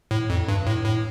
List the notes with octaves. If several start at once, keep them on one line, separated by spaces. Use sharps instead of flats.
A2
F2
G2
A2
A2